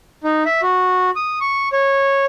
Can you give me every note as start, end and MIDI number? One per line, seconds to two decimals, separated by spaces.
0.24 0.43 63
0.45 0.61 76
0.62 1.10 66
1.16 1.39 87
1.41 1.69 85
1.73 2.26 73